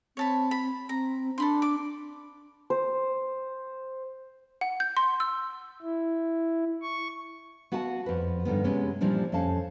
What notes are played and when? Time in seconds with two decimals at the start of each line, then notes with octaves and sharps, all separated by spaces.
0.17 C4 C#5 A5 B5
0.51 B5
0.89 C4 A#5
1.38 D4 A4 B5 C6
1.62 D6
2.70 C5
4.61 F#5
4.80 G6
4.97 C6
5.20 E6
5.82 E4
6.82 C#6
7.72 B3 F#4 F5 F#5 G#5 A5
8.06 F2 B4
8.45 G2 D3 D#3 B3
8.64 C3 G#3 B3 C#4
9.01 A#2 E3 F3 G3 D4
9.32 F2 C#4 F5 A5